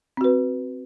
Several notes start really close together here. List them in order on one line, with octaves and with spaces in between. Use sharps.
C4 F#4 B4